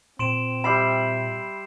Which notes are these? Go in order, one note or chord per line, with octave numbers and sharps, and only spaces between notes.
A#2 C4 C6 D7 E7
G3 E5 B5 G6 C7 E7